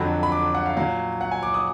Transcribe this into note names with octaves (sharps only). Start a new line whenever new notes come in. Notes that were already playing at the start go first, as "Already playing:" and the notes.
Already playing: F2 D3 F#3 B5
B5
D6
F#5
F5
A#2 F#3 F5
F#5
G#5
D6
D#6